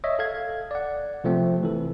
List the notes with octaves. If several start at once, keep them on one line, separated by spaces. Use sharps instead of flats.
C#5 D#5 E5
A4 F5 G#6
D5 F#5
C3 F3 A3 C4
E3 A4